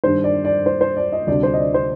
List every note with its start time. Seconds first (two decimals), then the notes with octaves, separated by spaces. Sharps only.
0.04 G2 D#3 G3 D4 C5
0.24 D5
0.45 D5
0.66 C5
0.81 C5
0.97 D5
1.12 D#5
1.27 D2 C3 G3 D4 D5
1.43 C5
1.54 D#5
1.59 D5
1.74 C5